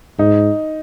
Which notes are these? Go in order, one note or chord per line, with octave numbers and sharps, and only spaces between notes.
G#2 D#4